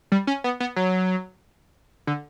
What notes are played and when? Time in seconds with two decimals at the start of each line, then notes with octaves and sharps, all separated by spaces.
0.12 G3
0.27 C#4
0.44 B3
0.60 B3
0.76 F#3
2.07 D3